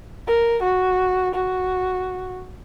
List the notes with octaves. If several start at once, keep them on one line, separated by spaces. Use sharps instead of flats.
A#4
F#4
F#4